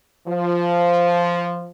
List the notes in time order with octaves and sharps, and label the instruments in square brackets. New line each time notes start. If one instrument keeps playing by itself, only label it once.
[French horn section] F3